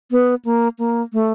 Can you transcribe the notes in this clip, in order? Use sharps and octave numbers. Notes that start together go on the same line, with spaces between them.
B3
A#3
A#3
A3